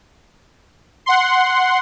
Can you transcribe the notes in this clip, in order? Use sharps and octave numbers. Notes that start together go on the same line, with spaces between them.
F#5 C6